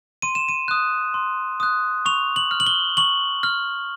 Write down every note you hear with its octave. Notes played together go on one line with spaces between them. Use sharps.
C6 D#7
E7
D#7
D#6 F#6
C6
D#6 F#6
C#6 F7
F#7
F6
F#7
G7
C#6 F#7
F6